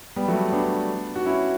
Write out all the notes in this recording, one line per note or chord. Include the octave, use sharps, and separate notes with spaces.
G3 B3
F#3 A3
B3 D4
F#4
C#4 E4